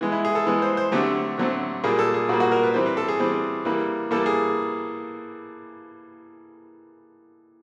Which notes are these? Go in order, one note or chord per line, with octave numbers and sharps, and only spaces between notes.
E3 G#3 B3
E4
G#4
A4
E3 G#3 B3
C5
C5
D3 F#3 A3 C4 G4
D3 F#3 A3 C4
A#2 G3 A#3 G#4
A4
G#4
A#2 G3 A#3 F#4
F#4
A#4
B4
E3 G3 C4 C5
B4
A4
G#4
E3 G3 C4
E3 G3 A#3
E3 G3 A#3 A4
G#4